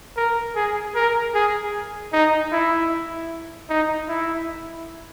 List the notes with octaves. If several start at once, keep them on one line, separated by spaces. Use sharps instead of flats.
A#4
G#4
A#4
G#4
D#4
E4
D#4
E4